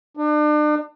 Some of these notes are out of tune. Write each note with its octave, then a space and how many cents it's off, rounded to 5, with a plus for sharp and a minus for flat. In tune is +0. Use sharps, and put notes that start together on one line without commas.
D4 +40